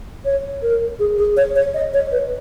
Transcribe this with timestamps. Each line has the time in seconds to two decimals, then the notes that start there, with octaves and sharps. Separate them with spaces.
0.25 C#5
0.63 A#4
1.00 G#4
1.18 G#4
1.37 C#5
1.56 C#5
1.74 D#5
1.94 C#5
2.12 B4